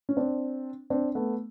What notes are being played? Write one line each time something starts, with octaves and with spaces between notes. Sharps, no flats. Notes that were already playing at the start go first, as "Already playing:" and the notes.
C#4
C4 D4
C4 D4
A3 B3